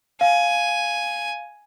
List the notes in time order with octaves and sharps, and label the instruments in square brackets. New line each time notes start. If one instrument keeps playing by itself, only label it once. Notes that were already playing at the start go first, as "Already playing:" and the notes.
[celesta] F5 [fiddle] G#5